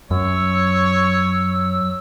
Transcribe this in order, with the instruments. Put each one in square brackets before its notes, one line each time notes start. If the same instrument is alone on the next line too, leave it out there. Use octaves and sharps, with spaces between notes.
[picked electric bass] F#2 [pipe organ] F#3 E6 [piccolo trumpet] C#5